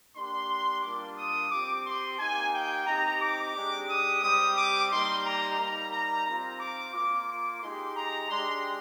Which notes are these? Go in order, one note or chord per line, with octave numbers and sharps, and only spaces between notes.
A#3 D4 G4 C6
G3 A#3 D4 F4 D6
D#6
C4 G4 D6
C6
A#3 D#4 G4 G#5
G5
C4 D#4 G4 A#5
D6
G#3 D4 G4
D#6
G3 C4 G4 D#6
D6
G3 A#3 D#4 G4 C6
A#5
G3 A#3 D#4 G4 A#5
A#5
C4 F4 A#5
D6
A#3 F4 D6
D6
G#3 D#4 G4 C6
A#5
G#3 D4 G4 C6